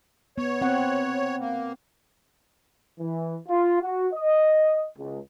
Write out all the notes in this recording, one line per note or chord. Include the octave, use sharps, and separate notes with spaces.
B3 C#5
C4 F#5
A#3
E3
F4
F#4
D#5
C#2